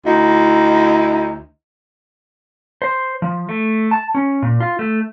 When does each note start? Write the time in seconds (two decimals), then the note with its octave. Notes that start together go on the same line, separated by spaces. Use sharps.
0.06 D2 D#4 E4
2.82 C5
3.22 F3
3.49 A3
3.91 A5
4.15 C#4
4.42 A#2
4.60 F4
4.79 A3